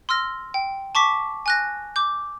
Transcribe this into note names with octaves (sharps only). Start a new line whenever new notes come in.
C6 E6 F6 A#6
G5
A5 C#6 D6 B6
G#5 F#6 A#6
D6 G6